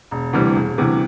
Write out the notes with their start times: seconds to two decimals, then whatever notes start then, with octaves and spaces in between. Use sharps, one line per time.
0.11 E1
0.33 D2 C3 E3 G3
0.56 E1
0.78 D2 C3 E3 G3